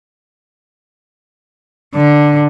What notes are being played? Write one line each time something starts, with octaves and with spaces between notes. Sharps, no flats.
D3